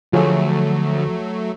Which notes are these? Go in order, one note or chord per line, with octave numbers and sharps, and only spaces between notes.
D2 F3 F#3 A3 F4 G#4 C#5